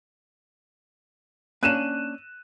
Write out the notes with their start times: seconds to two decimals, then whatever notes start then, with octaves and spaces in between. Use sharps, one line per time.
1.63 A#3 C#4 D4 F#6 D#7 E7